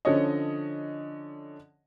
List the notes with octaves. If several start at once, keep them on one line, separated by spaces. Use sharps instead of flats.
D3 F3 C#4 C#5 D#5